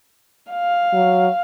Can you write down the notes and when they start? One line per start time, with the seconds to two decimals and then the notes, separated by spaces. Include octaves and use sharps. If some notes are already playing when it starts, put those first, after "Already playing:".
0.52 F5
0.93 F#3